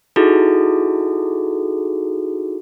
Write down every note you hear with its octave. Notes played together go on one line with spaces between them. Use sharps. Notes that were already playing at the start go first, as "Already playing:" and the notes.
D#4 E4 F#4 G#4 A4